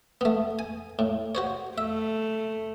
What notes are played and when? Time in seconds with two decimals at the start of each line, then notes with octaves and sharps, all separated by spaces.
0.21 A3 B3
0.59 G#5
0.99 A2
1.35 F#4 C5 C#5
1.78 A3 E5